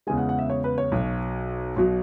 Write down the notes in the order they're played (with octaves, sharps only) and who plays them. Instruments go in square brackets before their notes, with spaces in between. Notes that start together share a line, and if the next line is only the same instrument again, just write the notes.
[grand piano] E2 C#3 G#3 G#5
F#5
F#5
E5
C#5
B4
C#5
B1 B2 F#3
B1 B2 F#3